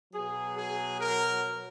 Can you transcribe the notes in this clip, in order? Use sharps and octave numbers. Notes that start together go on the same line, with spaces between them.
B2 F#3 G#4
G#4
A#4